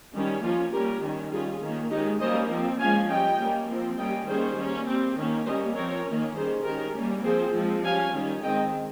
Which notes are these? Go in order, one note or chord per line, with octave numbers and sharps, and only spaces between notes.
D#3 G3 C#4
F3 A#3 C#4 F4
G3 A#3 C#4 G4 A#4
D#3 G3 C#4
G3 C#4 F4 G#4
D#3 A#3 C#4
D#3 G#3 C#4 D#4 G4
G3 A#3 C#4 C5 D#5
F3 C4
F3 G#3 C#4 F5 G#5
G3 C#4 D#5 G5
G3 A#3 C#4
F3 C4
G3 A#3 C#4 D#5 G5
D#3 G3 A#3 C#4 G#4 C5
G3 A#3 C#4
G3 C4
D#3 A#3 C#4
G3 A#3 C#4 C5 D#5
F3 C4 A#4 C#5
D#3 A#3 C#4
D#3 G3 C#4 G#4 C5
D#3 G#3 C#4 G4 A#4
G3 A#3 C#4
F3 C4 G#4 C5
F3 G#3 C4
G3 C#4 F5 G#5
D#3 G3 C#4
D#3 G#3 C4 D#5 G5